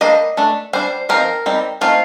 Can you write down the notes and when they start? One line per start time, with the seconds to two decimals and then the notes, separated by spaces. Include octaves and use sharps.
0.01 G3 A#3 D4 D#5
0.37 A3 D4
0.73 G3 D4 C5
1.09 F3 C4 D#4 A#4
1.46 G3 C4 D#4
1.81 A3 C4 D#4 F4